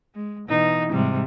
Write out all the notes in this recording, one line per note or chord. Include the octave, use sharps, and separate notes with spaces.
G#3
B2 E3 D#4
G#2 C3 G3